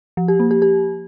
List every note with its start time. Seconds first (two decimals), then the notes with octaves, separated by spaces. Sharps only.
0.17 F3
0.28 G4
0.40 A#3
0.51 G4
0.62 G4